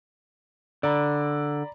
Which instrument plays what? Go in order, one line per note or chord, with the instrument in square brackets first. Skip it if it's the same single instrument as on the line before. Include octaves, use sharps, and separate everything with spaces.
[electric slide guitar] D3 [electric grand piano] D5 A#5 B5